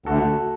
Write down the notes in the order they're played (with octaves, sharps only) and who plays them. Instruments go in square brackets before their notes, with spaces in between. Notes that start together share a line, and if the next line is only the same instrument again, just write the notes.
[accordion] D2 [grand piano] F#4 A4